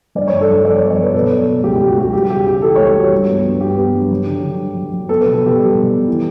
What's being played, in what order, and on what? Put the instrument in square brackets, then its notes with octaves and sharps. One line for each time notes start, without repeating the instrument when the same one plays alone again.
[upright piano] G2 D5
G2 C#5
A4
F#3
C#5
G2 D5
B3 C#5
D5
F#3 B4
B2 A4
B3
B2
C#2 G4
C#2 G4
F#4
C#2 G4
G3 G4
C#3 G4
C#3 G4
E3 A4
C#2 C#5
G4
G3 F#4
G2
B3
G2
B3 G4
B3
G2
F#3
D3
D3
F#3
F#3
F#3
B3 A4
B2 B4
A4
B2 G4
G3
B2
B3
E3